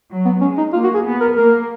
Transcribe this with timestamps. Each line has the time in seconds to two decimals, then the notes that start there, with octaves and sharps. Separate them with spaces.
0.10 F#3
0.25 B3
0.41 G#3 C#4
0.57 D#4
0.73 A#3 F4
0.84 F#4
0.94 G#4
1.04 B3
1.20 A#4
1.36 A#3 A#4